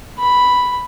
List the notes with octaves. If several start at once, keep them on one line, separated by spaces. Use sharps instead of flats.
B5